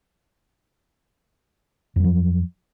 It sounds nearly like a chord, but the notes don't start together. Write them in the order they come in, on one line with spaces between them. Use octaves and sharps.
F2 F#3 F3